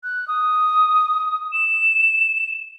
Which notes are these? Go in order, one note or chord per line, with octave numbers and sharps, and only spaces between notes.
F#6
D#6
E7